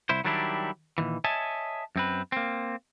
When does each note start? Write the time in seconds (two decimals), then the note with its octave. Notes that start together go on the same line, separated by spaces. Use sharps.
0.09 C2 E4 C5
0.25 D#3 F#3 G3 D4 E4 G4
0.98 A#2 D#3 E3
1.24 C#5 D#5 E5 G#5 A5
1.96 F#2 C4 B4
2.32 A#3 C4